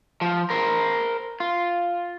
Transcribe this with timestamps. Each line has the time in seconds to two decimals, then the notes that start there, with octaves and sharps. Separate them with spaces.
0.21 F3
0.50 A#4 C5
1.40 F4